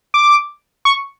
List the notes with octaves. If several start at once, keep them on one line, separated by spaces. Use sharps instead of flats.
D6
C#6